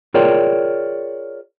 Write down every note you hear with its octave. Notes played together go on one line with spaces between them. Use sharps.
F4 G#4 A#4 C#5 D5 G5